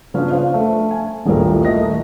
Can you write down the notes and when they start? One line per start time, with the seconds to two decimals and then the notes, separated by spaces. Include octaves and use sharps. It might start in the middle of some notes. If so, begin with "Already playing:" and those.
0.14 C#3 F3 B3 C#4 D4
0.30 C5 F5
0.54 A3
0.91 G#5
1.25 D#1 A#1 A2 F3 A#4
1.65 D#1 A3 A#4 D#5 A#6